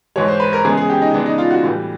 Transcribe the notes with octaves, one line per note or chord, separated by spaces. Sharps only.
G#2 E3 G#3 C#5
C5
B4
A#4
C#3 E3 G#3 B3 G#4
G#4
G4
D#4
C#3 E3 G#3 B3 D4
D#4
F4
F#4
A2 E3 G3